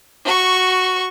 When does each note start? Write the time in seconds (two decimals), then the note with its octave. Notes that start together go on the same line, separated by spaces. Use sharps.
0.25 F#4 C#6